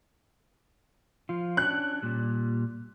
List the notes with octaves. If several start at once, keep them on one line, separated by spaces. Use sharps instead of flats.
F3 F4
C#4 D4 F#6
A#2 G3